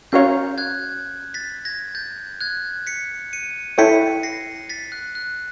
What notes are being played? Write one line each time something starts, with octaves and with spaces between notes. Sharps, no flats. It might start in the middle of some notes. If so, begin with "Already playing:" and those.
C#4 F#4 A#4 C#5 F5 G6
F#6 G#6
A6 B6
G#6 A#6
G6 A6
F#6 G#6
B6 C#7
C#7 D#7
E4 A4 C#5 E5 G5 B6 C#7
A#6 C7
A6 B6
F#6
F#6